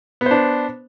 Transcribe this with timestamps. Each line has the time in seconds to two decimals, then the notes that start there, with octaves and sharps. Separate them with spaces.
0.21 B3
0.26 C5
0.31 D4